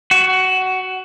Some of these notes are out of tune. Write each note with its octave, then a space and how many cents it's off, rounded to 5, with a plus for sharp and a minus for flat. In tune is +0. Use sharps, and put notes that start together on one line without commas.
F#4 +15